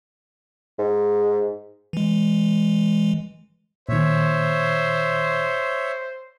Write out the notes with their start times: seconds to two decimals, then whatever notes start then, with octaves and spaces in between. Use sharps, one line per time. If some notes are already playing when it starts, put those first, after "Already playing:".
0.79 G#2
1.93 E3 G#3
3.89 A#2 D#3 C5 C#5 E5